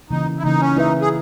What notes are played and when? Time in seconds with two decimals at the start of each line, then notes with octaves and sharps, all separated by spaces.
0.10 C#3 E3 A#3 D#4
0.38 E4
0.44 C#3 E3 A#3 D#4
0.60 C#4
0.75 A#3 D#4 E4 B4 E5
1.01 G#4